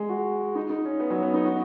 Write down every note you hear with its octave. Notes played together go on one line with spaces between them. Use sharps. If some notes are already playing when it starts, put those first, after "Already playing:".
Already playing: G#3
F#4
D#4
D#4
C#4
B3
F#3
B3
D#4
F#4